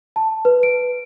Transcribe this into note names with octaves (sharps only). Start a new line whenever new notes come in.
A5
B4
D7